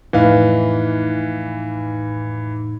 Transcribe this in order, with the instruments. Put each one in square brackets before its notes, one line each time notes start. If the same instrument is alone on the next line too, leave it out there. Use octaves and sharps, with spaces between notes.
[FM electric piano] F2 A2 D#4 [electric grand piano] E3 B4 F5